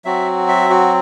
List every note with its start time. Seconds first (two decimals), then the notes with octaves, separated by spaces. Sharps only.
0.05 F#3 C4 F#4 E5
0.48 E5
0.70 F#4